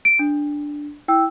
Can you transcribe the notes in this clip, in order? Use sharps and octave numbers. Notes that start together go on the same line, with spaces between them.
D7
D4
E4 G5 E6